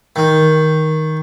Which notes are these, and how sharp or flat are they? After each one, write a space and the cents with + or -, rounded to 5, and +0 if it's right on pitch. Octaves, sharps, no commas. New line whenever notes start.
D#3 +10